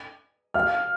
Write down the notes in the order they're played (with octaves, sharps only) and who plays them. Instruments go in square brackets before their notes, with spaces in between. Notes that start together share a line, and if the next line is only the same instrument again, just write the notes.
[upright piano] F5 F6